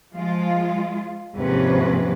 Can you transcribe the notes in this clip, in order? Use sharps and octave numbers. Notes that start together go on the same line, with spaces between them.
F3 G#3 F4
D#2 G#2 C3 F3 C#4 B4